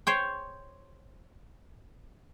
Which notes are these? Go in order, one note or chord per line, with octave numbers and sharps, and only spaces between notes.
C5 C#5 G5